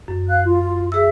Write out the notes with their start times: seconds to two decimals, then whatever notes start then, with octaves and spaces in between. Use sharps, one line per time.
0.08 F#2
0.28 F5 F#6
0.45 F4
0.92 G#4 E5 E6